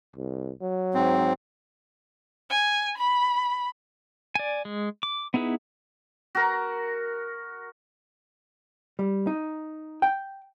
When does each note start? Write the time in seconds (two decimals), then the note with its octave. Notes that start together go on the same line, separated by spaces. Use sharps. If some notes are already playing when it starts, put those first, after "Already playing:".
0.16 C2
0.61 F#3
0.94 G#2 C4
2.50 G#5
2.98 B5
4.35 D5 G#5
4.65 G#3
5.03 D6
5.34 B3 D#4 E4 G#4 B4
6.35 F#4 A#4
8.99 G3
9.27 D#4
10.02 G5